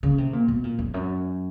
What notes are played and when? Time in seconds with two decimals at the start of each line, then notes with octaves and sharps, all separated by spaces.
0.03 C#3
0.18 C3
0.33 A#2
0.48 B2
0.64 A#2
0.79 F2
0.94 F#2